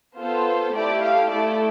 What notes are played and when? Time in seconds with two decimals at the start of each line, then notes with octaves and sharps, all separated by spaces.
0.18 B3 F4 A4 C5
0.75 A3 E4 G4 D5
1.02 F5
1.31 A3 E4 A4 D5